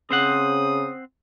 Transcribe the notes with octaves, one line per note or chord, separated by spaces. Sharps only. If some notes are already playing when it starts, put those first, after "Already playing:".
C#3 C4 C5 F#5 D#6